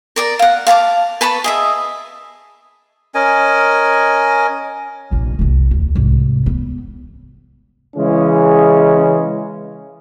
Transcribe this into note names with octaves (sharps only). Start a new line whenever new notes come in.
A#4 D5 A#5
F5 F#5
F5 A5 B5 D6
B4 A5 B5 C#6
G#4 D#5 E5
C#4 A#4 D#5 G#5
F1 A#1
F1 C2
D#2
C2 G#2
B3
C#3 E3 G#3 C#4